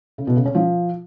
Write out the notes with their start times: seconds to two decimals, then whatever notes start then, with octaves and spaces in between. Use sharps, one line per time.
0.18 C#3
0.27 B2
0.36 C#3
0.46 C#4
0.55 F3